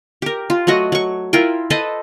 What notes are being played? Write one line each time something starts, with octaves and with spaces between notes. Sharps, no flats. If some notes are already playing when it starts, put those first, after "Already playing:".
G4 A#4
F4
F#3 A3 F#4 D#5
F#3 C#6
E4 F4 A#4 G5
A4 B4 C5 D#5